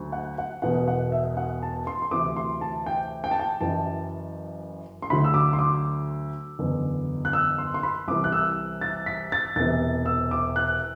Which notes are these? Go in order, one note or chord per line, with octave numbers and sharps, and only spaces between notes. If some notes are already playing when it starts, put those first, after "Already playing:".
Already playing: D2 D3 F#3
F#5
F#5
E1 E2 B2 F#5
F#5
E5
F#5
A5
C6
C6
D2 C3 E3 D6
C6
A5
G5
G5
A5
G5
F#1 F#2 E3 A5
C6
D2 D3 F#3 B5
E6
D6
C6
D6
F#1 E2 D3
F#6
E6
C6
C6
B5
C2 C3 E3 D6
F#6
E6
A6
B6
A6
E1 E2 C3 E3 A6
E6
D6
F#6